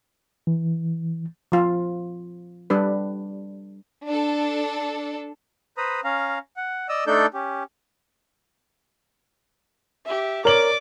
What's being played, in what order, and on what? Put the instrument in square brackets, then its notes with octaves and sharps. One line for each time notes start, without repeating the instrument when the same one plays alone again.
[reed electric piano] E3
[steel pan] F3 F4
G3 D4 B4
[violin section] D4 A4
[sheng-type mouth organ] B4 C5 A#5 B5 D#6
C#4 F5 A#5
F#5
D5 D#5 D#6 E6
A3 D4 D#4 A4 D5 G6
C#4 G4
[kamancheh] G4 E5
[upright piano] A#4 C#5 F#7 [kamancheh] D5 D6